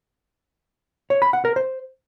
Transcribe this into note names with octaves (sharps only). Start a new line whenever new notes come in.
C#5
B5
F#5
A#4
C5